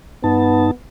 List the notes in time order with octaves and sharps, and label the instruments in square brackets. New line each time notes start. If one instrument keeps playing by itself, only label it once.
[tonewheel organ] G2 D#4 A5 [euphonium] B3